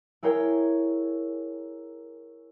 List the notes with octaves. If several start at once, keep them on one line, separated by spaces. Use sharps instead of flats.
E4 G#4 A#4 C#5 G5